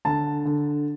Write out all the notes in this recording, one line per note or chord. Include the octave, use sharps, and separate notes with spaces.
D3 A5
D3